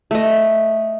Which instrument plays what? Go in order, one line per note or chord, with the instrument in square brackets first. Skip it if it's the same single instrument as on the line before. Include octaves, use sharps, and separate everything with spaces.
[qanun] A3 D#5